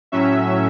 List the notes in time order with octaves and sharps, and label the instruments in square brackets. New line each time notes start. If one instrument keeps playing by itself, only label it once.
[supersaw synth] A2 F#3 C#4 E5